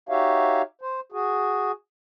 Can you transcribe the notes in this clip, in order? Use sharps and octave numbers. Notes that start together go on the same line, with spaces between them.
D#4 F#4 G4 C#5 E5 F5
C5
F#4 G#4